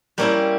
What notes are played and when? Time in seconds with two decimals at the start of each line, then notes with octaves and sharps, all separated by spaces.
0.18 G3 A#3 C#4 E4